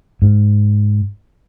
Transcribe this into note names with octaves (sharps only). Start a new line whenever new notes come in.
G#2